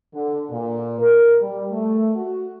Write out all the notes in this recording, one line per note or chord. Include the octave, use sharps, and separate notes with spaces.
D3
A#2
A#4
G3
A3
F#4